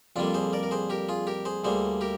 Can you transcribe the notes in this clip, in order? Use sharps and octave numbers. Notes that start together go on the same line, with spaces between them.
F2 D3 G3 A#3 D4 F4
G#4 C5
A#4 D5
A#4
G#4 C5
G4 A#4
F4 G#4
G4 A#4
G#4 C5
D2 D3 G3 A#3 G#4 C5
G4 A#4